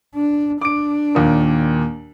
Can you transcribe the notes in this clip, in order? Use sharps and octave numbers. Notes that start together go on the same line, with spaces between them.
D4
D4 D6 D7
D#2 A#2